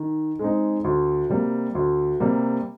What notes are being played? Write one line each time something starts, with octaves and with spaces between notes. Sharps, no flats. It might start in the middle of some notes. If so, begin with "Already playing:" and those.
Already playing: D#3
G#3 C4 D#4
D2
C3 G3 A#3
D2
C3 G3 A#3